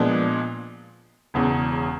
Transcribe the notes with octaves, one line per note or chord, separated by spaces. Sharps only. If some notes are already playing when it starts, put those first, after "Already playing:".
Already playing: A#2 F3 G#3 B3 D4
E1 E2 C#3